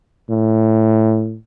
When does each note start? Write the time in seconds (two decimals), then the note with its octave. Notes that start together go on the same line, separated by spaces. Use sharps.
0.30 A2